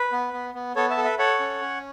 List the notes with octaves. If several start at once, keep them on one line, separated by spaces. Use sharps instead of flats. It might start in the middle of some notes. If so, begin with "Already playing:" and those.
Already playing: B4
B3
B3
B3
B3 A4 C#5
E5 A5
A4
B4 E5
A4 C#5 F#5
C#4
C#4